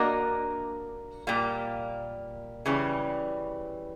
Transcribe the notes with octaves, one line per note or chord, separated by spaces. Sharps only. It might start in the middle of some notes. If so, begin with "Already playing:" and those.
Already playing: A#3 D4 F#4 A#4 D#5
A#2 G3 A#3
C#3 E3 G3